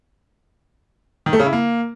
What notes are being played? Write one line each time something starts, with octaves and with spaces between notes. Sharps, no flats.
D#3
A3
C#3
E4
A#3